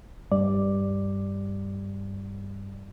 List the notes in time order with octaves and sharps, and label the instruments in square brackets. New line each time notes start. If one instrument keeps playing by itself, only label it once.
[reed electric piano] G2 G3 D5